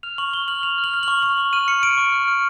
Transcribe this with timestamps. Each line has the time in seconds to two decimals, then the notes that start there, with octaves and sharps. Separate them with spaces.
0.03 F6 F7
0.18 C#6 F#7
0.33 C#6 G7
0.48 F6 F#7
0.63 C#6 F7
0.78 F6
0.84 F#7
0.94 F6
1.03 C#6 F#7
1.22 C#6 F#7
1.38 C#6
1.53 F6 D#7
1.68 F6 C#7
1.83 F6 D7
1.97 C#6
2.12 F6
2.28 F6